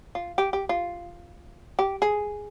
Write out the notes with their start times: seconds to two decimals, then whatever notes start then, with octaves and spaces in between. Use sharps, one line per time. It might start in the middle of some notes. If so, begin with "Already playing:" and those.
0.15 F4
0.38 G4
0.53 G4
0.69 F4
1.79 G4
2.02 G#4